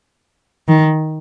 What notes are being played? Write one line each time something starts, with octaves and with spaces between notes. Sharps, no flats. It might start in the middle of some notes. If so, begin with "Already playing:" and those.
D#3